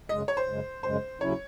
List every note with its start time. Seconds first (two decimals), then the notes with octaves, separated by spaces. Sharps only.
0.09 F#2 C#3 G#3 D#5
0.28 C#5
0.37 C5
0.47 F#2 C#3 G#3
0.83 F#2 C#3 G#3 C5
1.21 D#2 C#3 F#3 C#4 E4 C#5